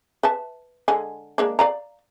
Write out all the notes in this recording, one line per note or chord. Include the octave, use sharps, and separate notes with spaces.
B4 E5 A5
D3 G#3 G#5
G#3 A#3 D4
D5 F5 A#5